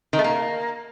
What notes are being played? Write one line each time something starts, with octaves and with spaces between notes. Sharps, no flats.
D#3
A3
A#3